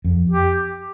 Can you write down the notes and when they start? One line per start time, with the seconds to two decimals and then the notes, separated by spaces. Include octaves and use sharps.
0.05 F2
0.30 G4